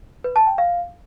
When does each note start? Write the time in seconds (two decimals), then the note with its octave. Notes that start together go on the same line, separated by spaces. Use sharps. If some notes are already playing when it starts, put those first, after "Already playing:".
0.24 B4
0.36 A5
0.47 G5
0.58 F5